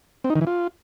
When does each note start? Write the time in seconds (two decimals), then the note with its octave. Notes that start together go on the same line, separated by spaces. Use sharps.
0.24 C4
0.30 D#4
0.36 D#3
0.41 E3
0.47 F4